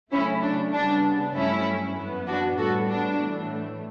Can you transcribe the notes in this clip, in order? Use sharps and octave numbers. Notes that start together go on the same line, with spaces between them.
C#3 F#3 A3 C#4 E4
D4
C#3 G3 B3 D4
G2 F#3 A3 C#4 E4
F#2 E3 B3
D4 F#4
A2 G3 B3 F#4 A4
D4
A2 E3 A3